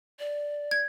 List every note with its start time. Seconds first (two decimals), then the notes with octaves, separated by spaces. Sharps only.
0.19 D5
0.71 G#6